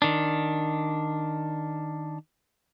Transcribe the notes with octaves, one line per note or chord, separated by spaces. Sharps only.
D#3 D4